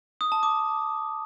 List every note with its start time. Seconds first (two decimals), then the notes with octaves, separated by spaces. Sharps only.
0.21 D#6
0.32 A5
0.43 D6